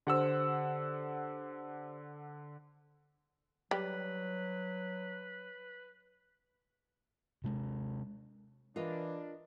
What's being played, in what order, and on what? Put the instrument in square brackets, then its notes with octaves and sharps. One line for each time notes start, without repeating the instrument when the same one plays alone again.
[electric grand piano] D3 F#5 E6 [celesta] G4 C5
[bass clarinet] F#3 [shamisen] G3 [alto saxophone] B4
[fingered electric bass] C3 G#3
[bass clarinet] E3 [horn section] D4 [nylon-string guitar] F4 A#4 D#5